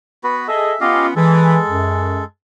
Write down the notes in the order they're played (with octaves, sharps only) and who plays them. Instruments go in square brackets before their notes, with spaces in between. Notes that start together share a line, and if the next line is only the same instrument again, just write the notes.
[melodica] B3 F#4 B4
[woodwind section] G#4 A4 D#5 [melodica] E5
[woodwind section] B3 C#4 F4 [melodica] G4 D#5 F5
[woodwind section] E3 [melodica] G#3 A4
[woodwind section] F#2